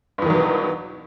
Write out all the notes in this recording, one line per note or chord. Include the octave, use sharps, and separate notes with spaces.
E2 G2 B2 D#3 F#3